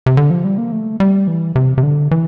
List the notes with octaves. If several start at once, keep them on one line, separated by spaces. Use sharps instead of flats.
C3
D3
F3
G3
A#3
A3
G3
E3
C3
C3
D3
E3